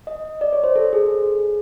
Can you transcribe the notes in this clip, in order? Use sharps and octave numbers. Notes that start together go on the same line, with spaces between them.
D#5
D5
C#5
C5
A4
G#4